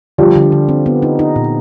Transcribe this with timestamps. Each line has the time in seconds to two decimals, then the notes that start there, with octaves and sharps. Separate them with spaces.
0.18 D3 F3 G3
0.36 D3
0.52 D3
0.69 C4
0.86 B3
1.02 D#4
1.19 D#4
1.36 A#2